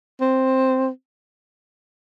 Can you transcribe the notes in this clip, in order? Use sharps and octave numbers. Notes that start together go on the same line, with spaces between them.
C4